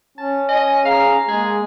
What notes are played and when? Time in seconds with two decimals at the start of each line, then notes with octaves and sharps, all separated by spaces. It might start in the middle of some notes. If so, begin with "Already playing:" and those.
0.18 C#4 A5
0.49 D#5 G#5
0.85 G#4 F5 A#5
1.29 G#3 A#3 G#4